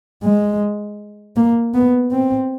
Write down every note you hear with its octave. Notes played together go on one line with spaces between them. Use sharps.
G#3
A#3
B3
C4